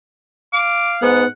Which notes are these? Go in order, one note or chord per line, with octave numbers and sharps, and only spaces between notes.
F5 D6
G#2 B3 F#5